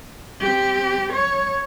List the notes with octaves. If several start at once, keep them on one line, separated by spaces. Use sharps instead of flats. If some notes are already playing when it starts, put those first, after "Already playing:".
C4 G4
C#5